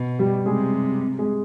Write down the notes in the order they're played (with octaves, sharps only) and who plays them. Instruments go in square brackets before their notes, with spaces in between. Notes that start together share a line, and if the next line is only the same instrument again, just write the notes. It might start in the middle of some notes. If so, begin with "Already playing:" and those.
Already playing: [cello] B2
[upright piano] G3 G4
[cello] C3 [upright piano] G#3 G#4
[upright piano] G#3 G#4